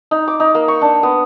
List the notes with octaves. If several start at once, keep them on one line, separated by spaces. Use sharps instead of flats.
D#4
D6
D#4
A#3
C#6
D4
B3